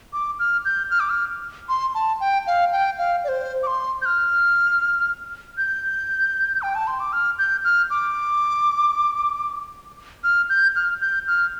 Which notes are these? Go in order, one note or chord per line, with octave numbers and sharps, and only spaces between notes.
D6
F6
G6
F6
D6
F6
C6
A5
G5
F5
G5
F5
D5
C5
D6
C6
G6
F6
G6
G5
A5
C6
D6
F6
G6
F6
D6
F6
G6
F6
G6
F6